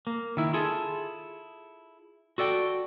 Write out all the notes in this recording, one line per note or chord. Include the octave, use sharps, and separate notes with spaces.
A#3
D#3 E4
E4 F4 G#4 A4
F#4 A4 D5 G5